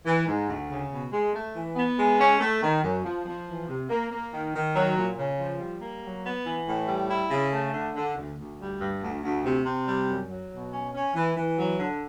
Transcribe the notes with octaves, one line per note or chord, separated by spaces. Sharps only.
E3
G#2
D2
C#3
B2
G#3
A3
E3
B3
G#3
C#4
A3
D#3
F#2
F3
F3
E3
C3
A#3
A#3
D#3
D#3
F#3
A#2
C#3
F3
G3
A#3
F#3
B3
E3
A2
G3
E4
C#3
A3
D3
D3
D2
D2
G3
G2
D2
D2
C3
C3
G3
F#2
F#3
B2
C#4
C#4
E3
E3
F#3
D3